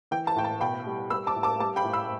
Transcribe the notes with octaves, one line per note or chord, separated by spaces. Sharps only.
E3 G5
A5
A2 G5
A5
B2 G5 B5
G3
G3 B5 E6
A5 D6
A2
A5 D6
G3 A5
G5 B5
A2
B5 E6